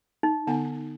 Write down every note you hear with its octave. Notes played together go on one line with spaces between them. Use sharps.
D#4
D3 B3 G#5